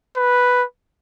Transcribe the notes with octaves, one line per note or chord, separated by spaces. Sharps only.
B4